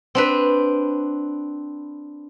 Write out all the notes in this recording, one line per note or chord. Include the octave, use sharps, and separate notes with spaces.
C4 D4 B4